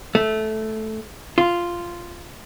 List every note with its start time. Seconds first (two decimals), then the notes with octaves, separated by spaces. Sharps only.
0.15 A3
1.38 F4